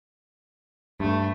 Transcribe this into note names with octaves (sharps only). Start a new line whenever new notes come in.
G2 A3